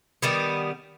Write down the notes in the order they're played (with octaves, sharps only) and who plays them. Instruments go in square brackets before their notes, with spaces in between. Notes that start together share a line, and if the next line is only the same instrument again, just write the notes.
[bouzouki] D#3 G3 B3